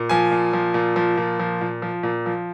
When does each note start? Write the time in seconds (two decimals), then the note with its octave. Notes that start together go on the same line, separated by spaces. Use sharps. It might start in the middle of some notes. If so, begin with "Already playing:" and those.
Already playing: A#2
0.09 F3 G#5
0.31 A#2
0.53 F3
0.74 A#2
0.96 F3
1.17 A#2
1.39 F3
1.61 A#2
1.82 F3
2.03 A#2
2.26 F3